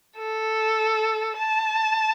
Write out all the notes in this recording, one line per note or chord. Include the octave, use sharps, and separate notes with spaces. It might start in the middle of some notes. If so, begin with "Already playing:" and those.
A4
A5